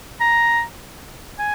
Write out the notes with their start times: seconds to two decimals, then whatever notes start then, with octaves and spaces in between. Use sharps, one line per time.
0.21 A#5
1.39 G#5